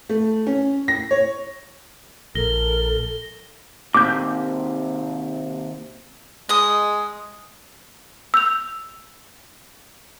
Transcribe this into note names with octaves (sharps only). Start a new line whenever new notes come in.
A3
C#4
A#6
C#5
A#1 A4 A#4 A#6 G7
D#2 C3 D6 G6
G#3 D#5 D#6
E6 G6 F7